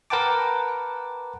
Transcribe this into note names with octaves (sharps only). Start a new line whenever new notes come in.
A#4 B4 F#5 G5 A5 D6